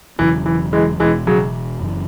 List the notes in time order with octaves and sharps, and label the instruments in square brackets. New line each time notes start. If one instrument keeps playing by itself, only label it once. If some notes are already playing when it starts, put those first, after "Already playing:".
[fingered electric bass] E1 E2 C#3 F#3 [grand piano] E3
[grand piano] E3
E3 G#3
[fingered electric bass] E1 E2 B2 [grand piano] E3 G#3
[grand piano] C#3 F#3
[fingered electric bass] F#1 F#2 C#3 E3